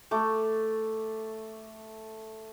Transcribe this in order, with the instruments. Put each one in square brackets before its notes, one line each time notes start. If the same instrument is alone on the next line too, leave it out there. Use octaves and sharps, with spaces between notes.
[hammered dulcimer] A3 D6